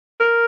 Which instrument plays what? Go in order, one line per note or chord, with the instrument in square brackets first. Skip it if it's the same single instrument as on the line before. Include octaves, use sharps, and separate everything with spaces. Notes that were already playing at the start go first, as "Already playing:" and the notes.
[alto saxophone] A#4